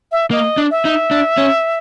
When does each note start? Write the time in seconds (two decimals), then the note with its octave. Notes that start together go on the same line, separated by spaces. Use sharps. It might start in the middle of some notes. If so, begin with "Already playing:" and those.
0.12 E5
0.31 A#3 D#5
0.57 D4
0.71 E5
0.85 D#4
1.11 D4
1.37 C#4